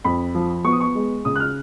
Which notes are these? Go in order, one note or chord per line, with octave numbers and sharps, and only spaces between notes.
F2 B5
F3
B3 C#6
D#6
C#6
G#3
C#3 D#6
F#6
F6